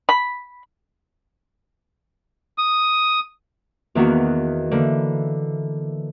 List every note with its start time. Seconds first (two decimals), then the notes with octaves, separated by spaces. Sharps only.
0.09 B5
2.58 D#6
3.95 E2 D#3 A#3 B3 D4 F#4
4.71 D3 E3 A#3